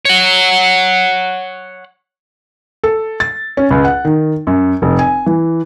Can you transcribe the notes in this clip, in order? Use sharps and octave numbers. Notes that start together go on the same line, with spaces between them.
C#5 F#5
A4
A6
C#4
C#2
F#5
D#3
F#2
F1
G#5
E3